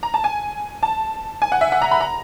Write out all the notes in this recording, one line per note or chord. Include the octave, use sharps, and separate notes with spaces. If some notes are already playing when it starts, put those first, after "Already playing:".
A#5
A5
G#5
A5
G#5
F#5
E5
F#5
A#5
B5
A#5